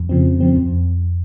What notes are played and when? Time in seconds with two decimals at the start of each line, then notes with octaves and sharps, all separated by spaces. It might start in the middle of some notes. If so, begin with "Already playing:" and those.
Already playing: F2
0.09 C#3 F3 C4
0.25 F2
0.40 C#3 F3 C4
0.56 F2